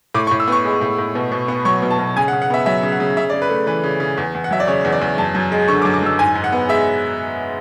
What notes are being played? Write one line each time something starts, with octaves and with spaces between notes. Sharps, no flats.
A2 D6
C#6
A2
E6
B3 C#6
G#3
A2
A2
B2
B2
B3
F#3 C#6
B2
A5
B2
C#3 G#5
F#5
C#3
F#5
B3 E5
F#3 E5
C#3
F#5
C#3
C#3 E5
D5
C#3
B4
A3
E3 B4
C#3
C#3
E2
E2
F#5
F#3 E5
D5
C#3 C#5
E2
D5
E2
F#2 A5
F#2
G#3
D3 C#6
D6
F#2
D6
F#2 E6
G#2 G#5
G#2
F#5
B3
G#3 E5